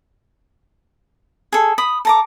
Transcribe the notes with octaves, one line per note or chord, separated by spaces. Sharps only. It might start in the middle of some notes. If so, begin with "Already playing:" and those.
G#4 A4
B5 D#6
A4 A#5 D6